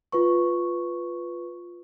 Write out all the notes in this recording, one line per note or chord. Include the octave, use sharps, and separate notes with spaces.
F4 B4 C#6